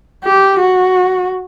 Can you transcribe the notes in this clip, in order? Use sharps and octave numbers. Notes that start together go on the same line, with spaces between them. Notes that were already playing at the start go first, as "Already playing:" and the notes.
G4
F#4